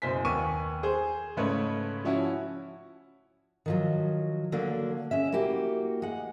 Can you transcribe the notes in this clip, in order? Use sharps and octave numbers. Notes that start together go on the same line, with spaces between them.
F#1 B2 C5 G#5 B6
D#2 B3 G#5 C#6 D#7
G#4 C5
G#2 C#3 A3 B4 C#5
F3 C#4 E4 F#4
D#3 F3 F#3
D3 F#3 A#3 D4
G#3 C#4 E5
A#3 E4 F#4 G4
G#3 F#5